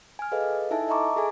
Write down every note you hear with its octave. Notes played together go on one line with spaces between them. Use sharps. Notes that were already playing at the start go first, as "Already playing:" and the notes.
G#5 F6
G#4 A4 B4 D#5 F5
D#4 E4 A4 E5 G#5 A5
D#5 E5 A5 A#5 C#6 D6
G#4 A4 G#5